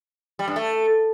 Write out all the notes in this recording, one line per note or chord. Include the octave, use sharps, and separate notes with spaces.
G3
G2
A3